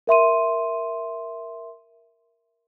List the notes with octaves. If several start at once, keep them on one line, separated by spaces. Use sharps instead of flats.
A#4 E5 C6 D#7